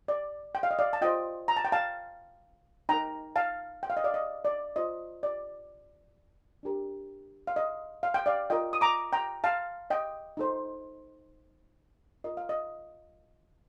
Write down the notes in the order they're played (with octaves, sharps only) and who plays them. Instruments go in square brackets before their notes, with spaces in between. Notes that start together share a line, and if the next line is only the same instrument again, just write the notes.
[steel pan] D5
G5
F5
D#5
D5 F5
A5
F4 C5 D#5 G5
A#5
A5
G5
F5 A5
D#4 A#4 G5 A#5
F5 A5
G5
F5
D#5
D5 F5
D#5
D5
F4 C5 D#5
D5
D4 G4 A#4
F5
D#5
F5
G5
D5 F5
F4 A#4 D#5 G5
D#6
A#5 D6
G5 A#5
F5 A5
D#5 G5
D#4 A4 C5
F4 A#4 D#5
F5
D#5